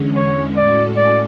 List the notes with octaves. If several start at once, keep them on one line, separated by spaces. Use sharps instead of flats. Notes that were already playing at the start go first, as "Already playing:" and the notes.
Already playing: E2 D3 G#3 C#4
C#5
A2 G#3 C#4 F#4 A4 D5
D5